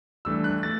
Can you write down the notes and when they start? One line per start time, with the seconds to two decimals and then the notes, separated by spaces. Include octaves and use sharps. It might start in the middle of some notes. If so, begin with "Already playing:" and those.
0.25 G2 E3 A3 D4 E6
0.44 F#6
0.63 A3 A6